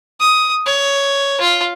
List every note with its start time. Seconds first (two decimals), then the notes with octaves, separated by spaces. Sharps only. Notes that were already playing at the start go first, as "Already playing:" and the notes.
0.20 D#6
0.66 C#5
1.40 F4